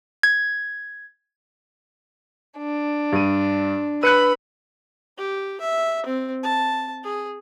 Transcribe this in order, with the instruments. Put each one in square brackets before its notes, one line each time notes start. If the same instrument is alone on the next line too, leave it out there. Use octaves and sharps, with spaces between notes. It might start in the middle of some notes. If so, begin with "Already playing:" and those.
[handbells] G#6
[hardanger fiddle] D4
[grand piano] G2 D#7
[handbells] B4 E6 [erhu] B5 [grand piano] F#6 C#7 D#7
[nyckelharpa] G4
E5
C4
A5
G#4